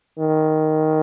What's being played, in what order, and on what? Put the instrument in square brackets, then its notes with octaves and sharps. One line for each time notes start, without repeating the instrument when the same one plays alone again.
[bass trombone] D#3